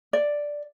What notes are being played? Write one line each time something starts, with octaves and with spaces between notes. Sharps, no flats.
D5